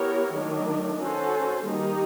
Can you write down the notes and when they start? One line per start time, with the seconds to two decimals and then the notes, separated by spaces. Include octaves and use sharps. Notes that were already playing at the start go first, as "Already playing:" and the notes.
Already playing: B3 E4 G4 A#4 C#5
0.35 D#3 F#3 A3 D4
1.01 C#4 F#4 A4 C5
1.66 D#3 G3 A#3 D#4 G4